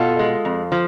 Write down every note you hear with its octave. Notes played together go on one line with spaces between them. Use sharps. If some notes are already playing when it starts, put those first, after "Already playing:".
Already playing: B2 F4 A4
G#3
F2
F3